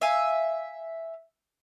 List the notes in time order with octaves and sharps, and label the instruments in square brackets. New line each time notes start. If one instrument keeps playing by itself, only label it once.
[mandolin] E5 F5 G#5